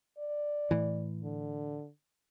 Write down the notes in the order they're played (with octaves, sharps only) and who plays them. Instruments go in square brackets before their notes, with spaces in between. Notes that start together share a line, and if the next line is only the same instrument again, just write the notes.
[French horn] D5
[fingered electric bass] A2 E3
[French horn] D3